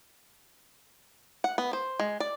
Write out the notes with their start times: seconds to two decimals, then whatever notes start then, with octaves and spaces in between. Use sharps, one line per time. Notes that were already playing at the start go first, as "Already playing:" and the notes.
1.44 F#5
1.58 B3
1.73 C5
2.00 G#3
2.20 D5